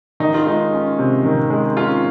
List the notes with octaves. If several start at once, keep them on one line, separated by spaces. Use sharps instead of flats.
D#3 D#4
F4
G#3 D#4
C#4
C3
D#3
G#3
C#4 F4